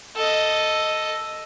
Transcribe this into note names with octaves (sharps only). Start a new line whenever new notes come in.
A4 D#5